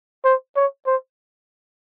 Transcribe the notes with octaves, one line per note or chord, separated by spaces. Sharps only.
C5
C#5
C5